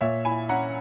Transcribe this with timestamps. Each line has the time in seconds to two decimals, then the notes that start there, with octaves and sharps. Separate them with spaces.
0.01 A#2 C#5 E5
0.25 E4 G#5 B5
0.49 C#4 F#5 A#5